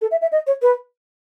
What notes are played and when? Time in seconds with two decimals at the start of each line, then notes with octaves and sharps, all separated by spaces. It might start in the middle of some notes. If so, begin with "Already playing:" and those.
0.02 A4
0.11 E5
0.22 E5
0.32 D#5
0.47 C#5
0.62 B4